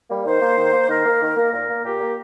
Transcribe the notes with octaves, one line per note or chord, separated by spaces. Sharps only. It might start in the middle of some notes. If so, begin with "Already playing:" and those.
G3 A#3
D#3 C5
A#3
D#3
A#3
D#3 A#4
A#3
D#3
A#3
A#2 A#4
A#3
A#2 G4
A#3